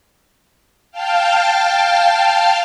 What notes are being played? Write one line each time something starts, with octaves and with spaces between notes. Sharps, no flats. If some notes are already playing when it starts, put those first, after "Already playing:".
F5 G5 A5 F6